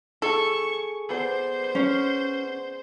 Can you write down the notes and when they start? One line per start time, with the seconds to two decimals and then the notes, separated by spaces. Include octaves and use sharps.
0.22 G#4 A4 C#6
1.09 B3 C5 D5
1.75 C#4